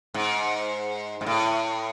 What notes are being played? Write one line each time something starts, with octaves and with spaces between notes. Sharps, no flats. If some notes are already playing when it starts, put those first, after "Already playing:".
G#2
G#2
A2